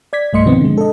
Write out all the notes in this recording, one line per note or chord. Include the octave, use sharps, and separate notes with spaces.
D5 G#6 B6
B1 G2 A3 D#5 C6 C#7
B2 D#3 F3 B3 C4
D3 G#3
A4 D#5